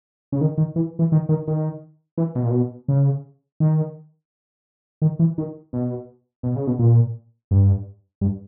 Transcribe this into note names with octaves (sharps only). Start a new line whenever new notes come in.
C#3
D#3
D#3
E3
E3
D#3
D#3
D#3
E3
B2
A#2
B2
C#3
D#3
D#3
E3
D#3
B2
B2
C#3
B2
A#2
G2
G2